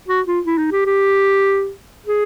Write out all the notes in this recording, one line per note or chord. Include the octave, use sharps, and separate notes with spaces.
F#4
F4
E4
D#4
G4
G4
G#4